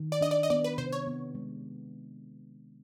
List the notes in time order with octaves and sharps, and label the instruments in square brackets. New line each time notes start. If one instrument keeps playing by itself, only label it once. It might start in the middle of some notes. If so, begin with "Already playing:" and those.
Already playing: [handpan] D#3
[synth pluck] D5
[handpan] D4 [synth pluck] D#5
[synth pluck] D5
D#5
[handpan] B3 [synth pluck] D5
[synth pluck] B4
[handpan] C3 [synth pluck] C5
[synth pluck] C#5
[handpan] B3
G#3